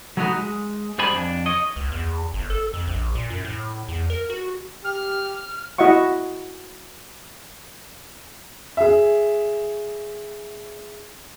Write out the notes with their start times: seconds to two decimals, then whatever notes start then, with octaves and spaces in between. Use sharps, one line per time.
0.17 F#3 A3 B3 D#4 F#4
0.38 G#3
0.98 G2 G#3 C5 D5 G#5 B5
1.12 F2 D4
1.46 C#5 D#5
1.76 C#2
1.92 E2
2.34 G1
2.50 A4
2.74 F2
2.87 A#1
3.15 A#2
3.30 F#2
3.45 A2
3.88 E2
4.10 A#4
4.30 F#4
4.84 G4 F6
5.78 E4 F#4 D#5 E5 F#5 C#6
8.77 G#4 E5